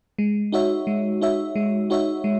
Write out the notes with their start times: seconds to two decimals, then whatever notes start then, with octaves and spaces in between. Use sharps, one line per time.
0.18 G#3
0.52 D#4 F#4 C#5 E5
0.87 G#3
1.21 D#4 F#4 C#5 E5
1.56 G#3
1.90 D#4 F#4 C#5 E5
2.24 G#3